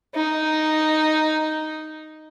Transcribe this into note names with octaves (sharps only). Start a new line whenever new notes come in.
D#4